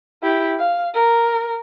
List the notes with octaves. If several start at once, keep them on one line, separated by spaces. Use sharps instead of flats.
E4 G4
F5
A#4